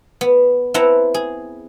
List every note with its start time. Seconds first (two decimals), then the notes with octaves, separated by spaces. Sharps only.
0.21 B3
0.74 B3 C4 E4 F#5 A5 A#5
1.14 G#4